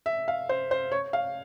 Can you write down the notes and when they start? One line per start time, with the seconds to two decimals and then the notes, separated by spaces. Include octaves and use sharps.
0.06 E5
0.28 F5
0.49 C5
0.71 C5
0.92 C#5
1.13 F5